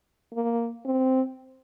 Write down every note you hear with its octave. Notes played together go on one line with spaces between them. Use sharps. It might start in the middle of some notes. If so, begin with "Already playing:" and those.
A#3
C4